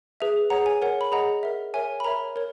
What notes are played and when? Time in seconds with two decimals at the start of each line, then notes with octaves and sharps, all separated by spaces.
0.20 G#4 B4 E5
0.50 G#4 C#5 F#5 A#5
0.66 G#5
0.82 A#4 C#5 F#5
1.01 B5
1.12 G#4 D#5 F#5 A#5
1.43 A#4 E5
1.74 A#4 C#5 E5 G#5
2.00 B5
2.04 A#4 C#5 E5 A#5
2.36 A#4 C#5